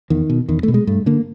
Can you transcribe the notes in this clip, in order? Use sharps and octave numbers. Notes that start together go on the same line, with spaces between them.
E2 D#3
B2
E2 D#3
B2 A3
G#3
G2 A3
D3 A#3